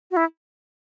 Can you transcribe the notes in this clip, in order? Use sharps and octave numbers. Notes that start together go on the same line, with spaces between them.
F#4
E4